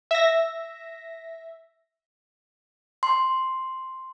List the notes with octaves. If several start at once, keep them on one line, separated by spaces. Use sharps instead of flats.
E5 A#6
C6